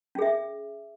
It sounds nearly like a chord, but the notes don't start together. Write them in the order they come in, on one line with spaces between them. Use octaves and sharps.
C#4 G#4 E5